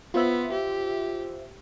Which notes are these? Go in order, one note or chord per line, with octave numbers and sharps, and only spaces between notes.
B3 F4 C5 E5
G4